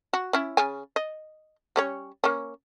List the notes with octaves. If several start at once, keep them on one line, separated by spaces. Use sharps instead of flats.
F#4
C#4 E4
C#3 G#5
D#5
G3 C#4 C#5
A#3 C#4